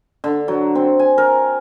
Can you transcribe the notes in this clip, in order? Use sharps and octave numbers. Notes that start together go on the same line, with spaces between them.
D3
F#3
C4
G#5
A#4